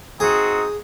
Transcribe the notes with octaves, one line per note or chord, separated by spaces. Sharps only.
C4 D#4 F#4 G#4